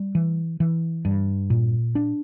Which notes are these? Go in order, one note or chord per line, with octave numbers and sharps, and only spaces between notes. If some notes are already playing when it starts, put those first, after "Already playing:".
Already playing: G3
E3
E3
G2
A#2
D4